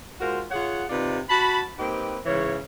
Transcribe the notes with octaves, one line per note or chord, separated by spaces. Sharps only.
G#3 F4 F#4 A#4 C5
F4 G#4 C#5 F#5
C3 D#4 F4 B4 D5
F#4 A5 B5
A#3 C4 D#4 G4 B4
G#2 C#3 E3 C#5